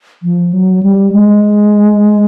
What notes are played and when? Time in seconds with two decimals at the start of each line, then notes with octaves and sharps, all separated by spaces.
0.23 F3
0.53 F#3
0.83 G3
1.12 G#3